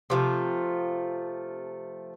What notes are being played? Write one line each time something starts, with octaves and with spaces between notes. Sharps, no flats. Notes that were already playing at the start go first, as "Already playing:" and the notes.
C3 F3 A3